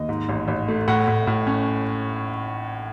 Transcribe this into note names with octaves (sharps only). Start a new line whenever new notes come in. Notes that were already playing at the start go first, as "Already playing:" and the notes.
Already playing: D#2 D#5
G#2
A1
A1
A3
A2 F#5
A2
A2
C#4